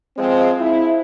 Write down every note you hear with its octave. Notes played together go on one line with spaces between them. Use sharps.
F3 G#3 C4
E4